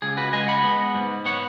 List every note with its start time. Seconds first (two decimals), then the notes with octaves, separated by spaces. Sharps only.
0.02 C#2 G#4
0.17 F#4 B4
0.33 G#3 D#5 G#5
0.48 F#5 B5
0.64 B3
0.95 G#2
1.25 B3 C#5 F#5